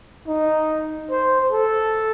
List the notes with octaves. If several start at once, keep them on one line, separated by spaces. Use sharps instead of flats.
D#4
C5
A4